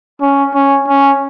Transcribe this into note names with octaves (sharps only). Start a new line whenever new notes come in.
C#4
C#4
C#4